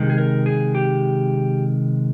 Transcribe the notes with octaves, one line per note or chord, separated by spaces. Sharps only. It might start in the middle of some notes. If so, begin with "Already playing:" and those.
Already playing: C3 D#3 G#3
G#4
A#4
G#4
G4